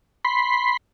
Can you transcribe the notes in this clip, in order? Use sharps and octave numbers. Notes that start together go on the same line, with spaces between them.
B5 C6